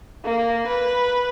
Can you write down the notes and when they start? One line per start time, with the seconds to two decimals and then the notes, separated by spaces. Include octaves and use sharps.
0.25 A#3
0.68 B4